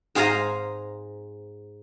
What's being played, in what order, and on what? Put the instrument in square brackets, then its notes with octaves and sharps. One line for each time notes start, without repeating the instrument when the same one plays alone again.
[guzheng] G#2 G#4 C5 F5 G#5 A#5